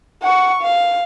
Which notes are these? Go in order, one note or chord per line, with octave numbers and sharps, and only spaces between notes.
F#5 C#6
F5